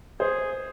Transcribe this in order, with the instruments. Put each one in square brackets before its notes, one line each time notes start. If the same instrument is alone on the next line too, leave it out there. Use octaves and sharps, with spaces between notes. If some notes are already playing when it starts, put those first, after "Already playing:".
[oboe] G#4 [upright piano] C5